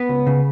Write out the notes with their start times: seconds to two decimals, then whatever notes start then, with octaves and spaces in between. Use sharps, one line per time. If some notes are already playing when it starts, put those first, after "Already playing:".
Already playing: B3 B4
0.09 C#2
0.27 C#3